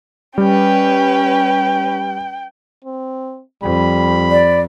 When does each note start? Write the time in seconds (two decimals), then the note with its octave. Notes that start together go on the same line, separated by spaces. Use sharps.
0.38 G3 C#4 B4 G5
2.84 C4
3.63 F2 G3 B5
4.31 D5